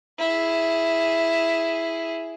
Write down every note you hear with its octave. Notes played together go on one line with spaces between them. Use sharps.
E4 G#4